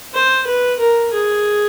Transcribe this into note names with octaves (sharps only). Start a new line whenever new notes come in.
C5
B4
A#4
G#4